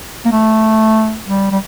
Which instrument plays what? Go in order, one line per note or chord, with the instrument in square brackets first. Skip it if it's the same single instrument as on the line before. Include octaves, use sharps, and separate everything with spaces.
[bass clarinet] A#3
A3
G3
G3